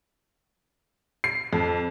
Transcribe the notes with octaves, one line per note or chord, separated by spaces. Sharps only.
C7
F2